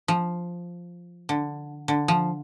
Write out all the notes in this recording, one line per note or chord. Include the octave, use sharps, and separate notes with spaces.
F3
D3
D3
F3